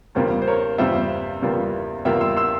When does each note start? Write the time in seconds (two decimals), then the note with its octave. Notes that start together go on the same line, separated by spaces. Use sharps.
0.15 E2 C#3 G3 A#3 F4 C5
0.42 C5
0.47 A#4 C#5
0.78 E2 C#3 G3 A#3 F4 C5 E5
1.42 E2 C#3 G3 A#3 F4
2.05 E2 C#3 G3 A#3 F4 E5 G5
2.21 C6 E6
2.37 C6 E6